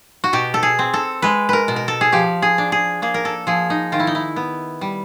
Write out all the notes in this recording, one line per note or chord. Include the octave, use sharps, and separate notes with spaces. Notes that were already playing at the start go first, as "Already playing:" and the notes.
F#4
B2 G4
A4
G#4
C4
A4
G#3 B4
A#4 B4
B2
A#4
A4
G#4
F3 G4
G#4
D4
G#4
A#3 G#4
A#4
A4
F3 G#4
D#4
D#3 F4
E4
D#4
E4
B3
G3